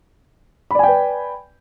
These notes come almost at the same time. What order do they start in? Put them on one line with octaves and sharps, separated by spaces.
B5 D5 G#5 G5 B4